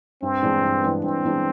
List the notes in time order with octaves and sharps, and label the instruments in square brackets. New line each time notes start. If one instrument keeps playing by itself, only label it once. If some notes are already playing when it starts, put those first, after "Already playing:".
[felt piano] G2 [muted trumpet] C4
[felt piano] E3 G#3 B3 D4
G2
E3 G#3 B3 D4
[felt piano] G2 [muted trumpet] C4
[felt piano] E3 G#3 B3 D4